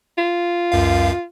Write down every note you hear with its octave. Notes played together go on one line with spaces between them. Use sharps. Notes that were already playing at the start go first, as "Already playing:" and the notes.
F4
C#2 F#2 F5